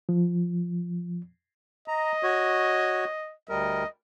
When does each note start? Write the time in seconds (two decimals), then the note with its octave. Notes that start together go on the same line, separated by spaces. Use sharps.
0.09 F3
1.88 D#5 A#5
2.23 F#4 C#5
3.49 D2 G3 A#4 D#5